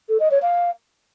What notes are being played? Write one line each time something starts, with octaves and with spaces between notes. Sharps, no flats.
A4
D#5
C#5
F5